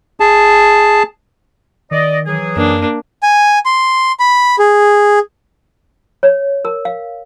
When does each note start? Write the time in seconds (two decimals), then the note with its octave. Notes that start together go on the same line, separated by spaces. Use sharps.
0.20 G#4 A5
1.91 D#3 D5 D#5
2.26 E3 F#3 G#4
2.56 F#2 A#3 D4
3.23 G#5
3.66 C6
4.20 B5
4.59 G#4
6.23 C#5
6.65 A#4
6.85 F5